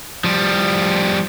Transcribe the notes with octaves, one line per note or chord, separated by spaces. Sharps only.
F3 G3